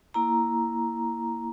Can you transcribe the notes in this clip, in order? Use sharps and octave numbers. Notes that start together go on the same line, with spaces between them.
A#3 E4 A#5